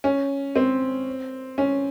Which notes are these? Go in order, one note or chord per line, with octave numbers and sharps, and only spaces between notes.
C#4
C4
C#4